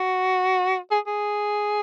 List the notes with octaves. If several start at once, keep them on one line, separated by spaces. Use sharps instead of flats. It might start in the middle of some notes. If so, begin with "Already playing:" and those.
Already playing: F#4
G#4
G#4